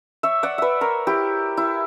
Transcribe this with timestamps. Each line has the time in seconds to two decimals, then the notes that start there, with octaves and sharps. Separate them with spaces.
0.23 C#5 E5
0.43 D5 F#5
0.58 B4 D5 E5
0.81 A#4 C#5
1.07 E4 G4
1.57 E4